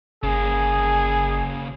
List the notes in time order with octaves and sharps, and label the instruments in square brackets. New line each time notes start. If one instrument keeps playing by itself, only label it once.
[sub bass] G1 [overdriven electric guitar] C#3 A#3 [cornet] G#4